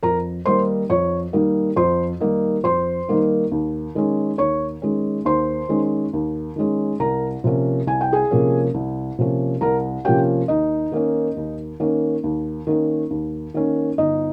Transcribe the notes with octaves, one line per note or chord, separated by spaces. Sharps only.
F2 A#4 A#5
D#3 G3 A#3 D#4 C5 C6
F2 C#5 C#6
D#3 G3 A#3 D#4
F2 C5 C6
D#3 G3 A#3 D#4
F2 C5 C6
D#3 G3 A#3 D#4
D#2
D#3 G#3 C#4
D#2 C#5 C#6
D#3 G#3 C#4
D#2 C5 C6
D#3 G#3 C#4
D#2
D#3 G#3 C#4
C2 A#4 A#5
C3 F3 A#3 C#4
C2 G#5
G5
G#4 G#5
C3 F3 A#3 C#4
C2
C3 F3 A#3 C#4
C2 A#4 A#5
C3 F3 A#3 C#4 G4 G5
D#2 D#4 D#5
D#3 A#3 C#4
D#2
D#3 A#3 C#4
D#2
D#3 A#3 C#4
D#2
D#3 A#3 C#4
G1 D#4 D#5